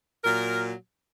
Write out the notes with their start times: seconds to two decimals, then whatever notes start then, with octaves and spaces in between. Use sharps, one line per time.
0.24 A#2 F#3 A#4